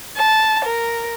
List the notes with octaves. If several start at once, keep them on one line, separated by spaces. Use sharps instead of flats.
A5
A#4